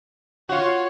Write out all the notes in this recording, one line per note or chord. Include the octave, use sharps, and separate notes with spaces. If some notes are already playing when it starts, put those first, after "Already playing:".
F4 F#4 C#5